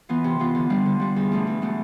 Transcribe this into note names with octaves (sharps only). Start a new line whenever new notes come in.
E3 B3 F4
C3
E3 B3 F4
D3
G3 D4 F4
D3
G3 D4 F4
E2
B2 A3 D4
E2
B2 A3 D4